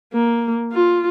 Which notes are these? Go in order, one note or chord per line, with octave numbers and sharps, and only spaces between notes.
A#3
F4